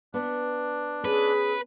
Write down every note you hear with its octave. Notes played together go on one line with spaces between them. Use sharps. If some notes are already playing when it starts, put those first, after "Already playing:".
B3 D4
C#4 G#4 B4